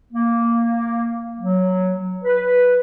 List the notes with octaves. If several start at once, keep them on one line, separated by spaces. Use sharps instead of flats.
A#3
F#3
B4